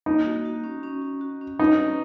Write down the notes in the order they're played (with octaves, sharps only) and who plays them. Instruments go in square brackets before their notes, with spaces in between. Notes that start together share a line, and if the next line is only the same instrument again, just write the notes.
[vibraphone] A#3 [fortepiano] D#4
[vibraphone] F#4
F#4
C#4
C#4
F#4
F#4
C#4
[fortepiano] D#4 [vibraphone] B4
[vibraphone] C#4